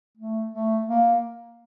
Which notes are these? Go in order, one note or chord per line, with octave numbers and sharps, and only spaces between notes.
A3
A3
A#3